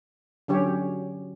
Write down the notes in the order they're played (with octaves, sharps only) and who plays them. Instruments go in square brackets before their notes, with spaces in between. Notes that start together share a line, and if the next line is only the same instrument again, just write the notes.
[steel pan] D3 F#3 C#4 G4 C#5